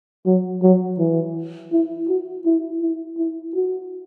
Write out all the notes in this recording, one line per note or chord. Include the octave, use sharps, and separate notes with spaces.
F#3
F#3
E3
E4
F#4
E4
E4
E4
F#4